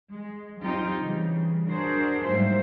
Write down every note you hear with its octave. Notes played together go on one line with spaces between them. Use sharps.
G#3
F#3 C4 D#4 F4 G4
C#3 E3 G3
D4 F#4 G#4 A#4 C5
G#2 F#3 G3 A#3 C5 E5